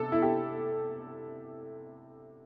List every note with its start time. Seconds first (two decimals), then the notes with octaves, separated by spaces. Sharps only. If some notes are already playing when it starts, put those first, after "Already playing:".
Already playing: C3 A4
0.12 E4
0.22 G4